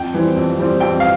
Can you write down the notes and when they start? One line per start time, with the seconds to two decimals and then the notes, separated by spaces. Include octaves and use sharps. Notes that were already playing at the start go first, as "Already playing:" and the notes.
Already playing: F2 G5
0.14 E3 G3 C4
0.36 F2
0.58 E3 G3 C4
0.80 F2 G5
1.00 F5